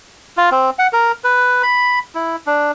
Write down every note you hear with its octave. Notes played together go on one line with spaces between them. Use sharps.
F4
C4
F#5
A#4
B4
B5
E4
D4